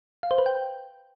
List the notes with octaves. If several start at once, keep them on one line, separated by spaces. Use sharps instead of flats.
F5
C5
B4
G5